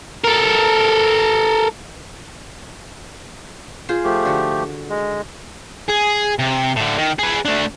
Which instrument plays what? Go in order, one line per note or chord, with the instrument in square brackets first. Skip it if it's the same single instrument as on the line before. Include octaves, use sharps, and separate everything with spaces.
[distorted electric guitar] A4 A#4
[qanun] F4 G#4 C5
[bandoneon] F3 A3 G4
[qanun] D3 F#4
[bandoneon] G#3
[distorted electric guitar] G#4
C3
A2 D3
D#3
G#4 B4
A3 D4